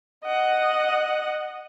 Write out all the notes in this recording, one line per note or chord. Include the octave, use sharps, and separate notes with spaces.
D#5 F#5